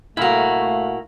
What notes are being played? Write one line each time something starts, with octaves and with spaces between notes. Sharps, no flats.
A#2 A3 E4 F#4 A#4 F5